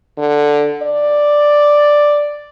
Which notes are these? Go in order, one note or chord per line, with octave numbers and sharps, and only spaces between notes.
D3
D5